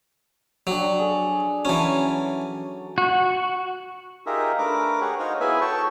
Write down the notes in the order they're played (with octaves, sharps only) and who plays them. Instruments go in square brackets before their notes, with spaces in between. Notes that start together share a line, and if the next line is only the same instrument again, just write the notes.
[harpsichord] F#3 [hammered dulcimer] D4 G4 C#6
[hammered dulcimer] G#4 A4
[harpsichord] E3 C#4 [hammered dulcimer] F#3 A5
[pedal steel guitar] F#4
[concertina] D#4 F4 G4 G#4 A#4 E5
A3 D4 A#4 B4 D6
G4 G#4 C#5 F#5
D#4 F#4 C5 C#5 F5
B3 E4 G#4 B4 E5 G#5
F#4 A4 C#5 G5 A5 C#6